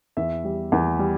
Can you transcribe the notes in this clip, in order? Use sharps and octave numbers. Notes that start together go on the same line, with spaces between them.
E2 E5
G3
E2
G3